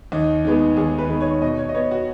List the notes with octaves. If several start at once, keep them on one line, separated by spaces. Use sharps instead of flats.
D#2 D#4
D#3 G#3 B3
D#2 G#4
B4
D#3 G#3 B3
C#5
B2 D#5
C#5
D#5
B3 C#5
F#4